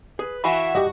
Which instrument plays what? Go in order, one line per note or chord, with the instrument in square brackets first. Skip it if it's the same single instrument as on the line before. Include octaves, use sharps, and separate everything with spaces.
[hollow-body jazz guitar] G#4 [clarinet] B4
[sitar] E3 F#4 [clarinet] E5 [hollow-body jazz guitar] F5 G#5 B5
[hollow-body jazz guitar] G2 [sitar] F#4 [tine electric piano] G4 D#5